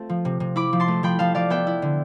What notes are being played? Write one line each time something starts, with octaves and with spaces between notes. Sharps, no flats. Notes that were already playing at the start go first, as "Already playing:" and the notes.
Already playing: A3 C4 F4 A5
F3
C3
C3
E4 B5 D6
F3
A5 C6
A3
F3 G5 B5
F3 F5 A5
F3 D5 F5
B3 E5 G5
E4
D3